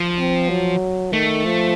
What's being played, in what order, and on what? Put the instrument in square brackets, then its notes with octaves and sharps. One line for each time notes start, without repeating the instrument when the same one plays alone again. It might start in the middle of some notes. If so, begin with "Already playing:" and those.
Already playing: [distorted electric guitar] F3
[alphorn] C4
F#3
[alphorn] D#3 [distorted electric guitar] A3
[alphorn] F3